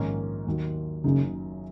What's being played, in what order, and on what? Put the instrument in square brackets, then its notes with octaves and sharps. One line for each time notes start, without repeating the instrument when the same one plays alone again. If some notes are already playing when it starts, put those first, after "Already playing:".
Already playing: [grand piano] A#1 G#2 D#3 A#3 C#4
D#2 D#3 F#3
[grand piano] F#1 F#2 F#3 D#4 F#4 [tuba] C#3